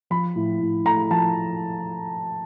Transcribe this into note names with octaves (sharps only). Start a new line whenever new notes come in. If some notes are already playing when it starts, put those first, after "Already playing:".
F3 B5
A2
A2
A3 A#5
F3 A5